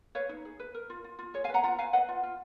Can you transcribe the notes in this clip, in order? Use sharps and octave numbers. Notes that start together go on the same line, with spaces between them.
B4 C#5 F5
D#4
G#4
B4
A#4
F4
F4
F4
G#4 C#5
F5 G#5
B4 F#5 A#5
F4 F#5 A#5
B4 F5 G#5
B4 D#5 F#5
F4
F4